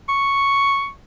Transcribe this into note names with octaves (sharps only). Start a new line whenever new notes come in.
C#6